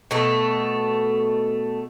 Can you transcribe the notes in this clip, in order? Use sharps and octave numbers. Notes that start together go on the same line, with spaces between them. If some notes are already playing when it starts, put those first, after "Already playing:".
B2 A3